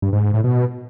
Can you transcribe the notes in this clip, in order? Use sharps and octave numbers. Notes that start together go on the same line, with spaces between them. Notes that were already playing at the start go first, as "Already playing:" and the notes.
G2
G#2
G#2
A2
B2